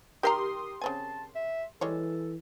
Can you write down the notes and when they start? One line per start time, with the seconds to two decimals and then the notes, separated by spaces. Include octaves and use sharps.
0.23 D#3 G4 A#4 G5 A#5 C6 D#6
0.81 C#3 C4 G#5 A5
1.35 E5
1.81 E3 G3 G#3 A4 C#5